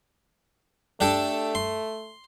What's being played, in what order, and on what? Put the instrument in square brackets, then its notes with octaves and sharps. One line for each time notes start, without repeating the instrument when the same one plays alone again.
[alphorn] A3 [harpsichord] D4 G4 A4
[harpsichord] C6